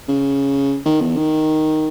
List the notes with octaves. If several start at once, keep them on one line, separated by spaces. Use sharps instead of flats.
C#3
D#3
E2
D#3